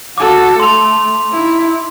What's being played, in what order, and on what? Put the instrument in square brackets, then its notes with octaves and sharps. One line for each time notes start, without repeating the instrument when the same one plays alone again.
[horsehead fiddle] F#4 A4 [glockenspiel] D6
[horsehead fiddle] A3 [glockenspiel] C6 F7
[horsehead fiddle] D#4 E4